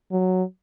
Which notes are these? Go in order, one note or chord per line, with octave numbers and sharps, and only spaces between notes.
F#3